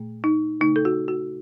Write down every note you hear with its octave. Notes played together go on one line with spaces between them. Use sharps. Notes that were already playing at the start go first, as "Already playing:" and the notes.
Already playing: A#2 A3
D#4
C#3 A3 D#4
A4
F#4
F#4